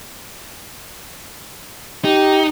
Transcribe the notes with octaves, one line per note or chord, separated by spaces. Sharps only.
D#4 G4